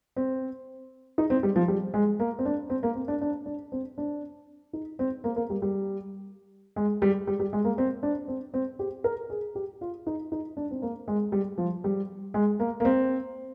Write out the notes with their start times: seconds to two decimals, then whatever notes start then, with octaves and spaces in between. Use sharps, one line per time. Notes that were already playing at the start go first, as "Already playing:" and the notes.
0.16 C4
1.18 D#4
1.30 C4
1.43 G3
1.56 F3
1.68 G3
1.94 G#3
2.20 A#3
2.39 C4
2.45 D4
2.70 C4
2.83 A#3
2.95 C4
3.08 D4
3.22 D4
3.46 D4
3.72 C4
3.98 D4
4.73 D#4
4.99 C4
5.24 A#3
5.36 A#3
5.50 G3
5.62 G3
6.76 G#3
7.02 G3
7.27 G3
7.40 G3
7.53 G#3
7.65 A#3
7.78 C4
8.03 D4
8.28 C4
8.54 C4
8.79 G4
9.04 A#4
9.30 G#4
9.55 G4
9.81 F4
10.07 D#4
10.32 D#4
10.57 D4
10.71 C4
10.82 A#3
11.08 G#3
11.32 G3
11.58 F3
11.84 G3
12.34 G#3
12.60 A#3
12.80 A#3
12.85 C4